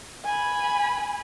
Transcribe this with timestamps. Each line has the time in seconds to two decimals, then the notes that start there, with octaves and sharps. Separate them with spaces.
0.25 G#5 B5